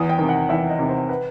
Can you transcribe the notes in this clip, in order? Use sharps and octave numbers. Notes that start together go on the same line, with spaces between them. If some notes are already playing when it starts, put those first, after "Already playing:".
Already playing: E2 D#6
G5
C3 D#3
F#5
E2 E5
D#5
C3 D#3
C5
B4